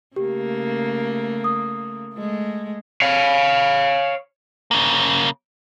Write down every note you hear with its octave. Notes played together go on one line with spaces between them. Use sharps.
C#3 A3 A#3 G4
D#6
G#3 A3
C#5 F5
C#3 A#3